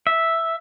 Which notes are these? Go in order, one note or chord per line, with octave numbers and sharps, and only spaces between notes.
E5